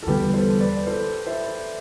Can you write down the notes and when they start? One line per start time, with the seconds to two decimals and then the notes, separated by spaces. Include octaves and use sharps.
0.03 A4
0.07 E2 D3 G3 B3 G4 B4
0.34 A4 C5
0.60 B4 D5
0.87 A4 C5
1.27 C5 E5